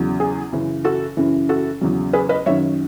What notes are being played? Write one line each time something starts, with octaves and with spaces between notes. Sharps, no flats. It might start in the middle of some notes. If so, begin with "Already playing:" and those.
Already playing: E2 C#3 F#3
G#4
F#2 C#3 E3
F#4 A4
F#2 C#3 E3
F#4 A4
E2 C#3 F#3
G#4 B4
B4 D#5
F#2 D#3 F#3 C#5 E5